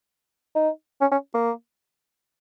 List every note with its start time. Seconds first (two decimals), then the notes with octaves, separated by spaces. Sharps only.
0.56 D#4
1.01 C#4
1.12 C#4
1.35 A#3